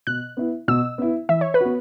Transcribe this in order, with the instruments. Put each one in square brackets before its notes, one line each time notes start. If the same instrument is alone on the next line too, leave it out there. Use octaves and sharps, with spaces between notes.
[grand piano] B2 [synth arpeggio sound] F#6
[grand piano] B3 E4
[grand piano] B2 [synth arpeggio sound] E6
[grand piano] B3 E4
[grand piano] E3 [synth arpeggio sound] E5
[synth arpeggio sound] C#5
B4
[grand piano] B3 F#4